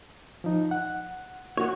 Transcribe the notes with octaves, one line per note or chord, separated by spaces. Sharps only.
F3 D#4
F#5
F#4 C#5